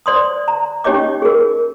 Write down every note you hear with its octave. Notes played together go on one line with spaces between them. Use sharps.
C5 D5 C6 D#6
A#5
C#4 D#4 G4 C#5 D#5 D6
G#4 A#4